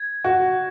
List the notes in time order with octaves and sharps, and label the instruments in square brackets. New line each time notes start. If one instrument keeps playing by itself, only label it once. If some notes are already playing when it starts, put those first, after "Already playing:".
Already playing: [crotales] G#6
[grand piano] F#4